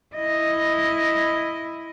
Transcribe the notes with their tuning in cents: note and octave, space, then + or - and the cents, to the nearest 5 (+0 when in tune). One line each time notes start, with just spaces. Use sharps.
E4 +0 D#5 +0